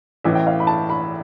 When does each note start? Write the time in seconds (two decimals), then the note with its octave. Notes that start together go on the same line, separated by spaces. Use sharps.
0.24 A1 A2 E3 E5
0.35 G5
0.47 F5
0.60 B5
0.67 A5
0.90 B5